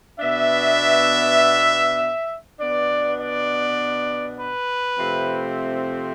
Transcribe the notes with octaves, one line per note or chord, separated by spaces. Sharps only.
B2 B3 D4 E5
B2 B3 D4 D5
D5
B4
C3 F3 A3 C4